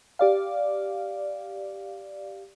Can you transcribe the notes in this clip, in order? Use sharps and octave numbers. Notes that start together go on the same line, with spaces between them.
G4 D5 F5